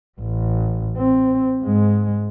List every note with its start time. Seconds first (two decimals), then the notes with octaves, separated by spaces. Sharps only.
0.20 A1
0.98 C4
1.63 G#2 G#3